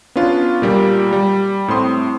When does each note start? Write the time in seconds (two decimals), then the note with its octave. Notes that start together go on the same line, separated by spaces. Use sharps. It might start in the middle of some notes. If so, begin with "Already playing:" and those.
0.16 B3 C#4 D4 F4
0.62 A#2 G3 A#3
1.13 G3
1.68 A2 C4 C6 D#6